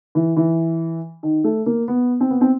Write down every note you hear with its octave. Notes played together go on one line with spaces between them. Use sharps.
E3
E3
D#3
A3
A#3
B3
C4
B3
C4